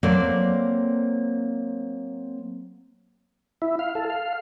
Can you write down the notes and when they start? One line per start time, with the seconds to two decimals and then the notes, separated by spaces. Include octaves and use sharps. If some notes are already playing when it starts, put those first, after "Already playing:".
0.03 F#3 A#3 C4 A4 C5 D5
3.62 E4
3.79 F5
3.95 A4
4.10 F5